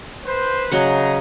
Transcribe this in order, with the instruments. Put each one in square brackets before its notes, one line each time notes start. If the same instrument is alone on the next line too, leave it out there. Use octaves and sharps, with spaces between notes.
[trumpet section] B4 C5
[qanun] C#3 F#3 F#5 [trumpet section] D#5 A#5